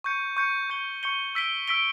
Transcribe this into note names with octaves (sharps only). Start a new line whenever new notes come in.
C#6 G6 C#7
C#6 G6 C#7
C#6 G6 C#7 G7
C#6 G6 C#7 G7
E6 B6 D7 G7
E6 B6 D7 G7